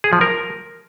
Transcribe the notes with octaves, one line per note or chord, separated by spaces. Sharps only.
G#4
F3
A#4